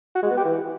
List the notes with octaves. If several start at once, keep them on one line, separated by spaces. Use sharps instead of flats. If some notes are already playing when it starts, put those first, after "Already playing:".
F#4
G#3
B3
G4
E3